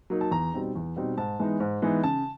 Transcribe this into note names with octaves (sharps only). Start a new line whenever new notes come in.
F#3 A#3 D#4
A5
E2 A#5
B2 G3 C4 D#4
E2
B2 G3 C4 D#4
G#2 A5
E3 G#3 B3 D#4
G#2
E3 G#3 B3 D#4
C#3 A5